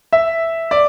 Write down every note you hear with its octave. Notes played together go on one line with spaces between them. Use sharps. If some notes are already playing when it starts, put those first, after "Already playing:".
E5
D5